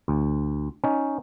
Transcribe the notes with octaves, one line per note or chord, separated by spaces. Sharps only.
D2
C#4 D#4